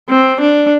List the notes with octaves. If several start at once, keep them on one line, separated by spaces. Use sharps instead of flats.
C4
D4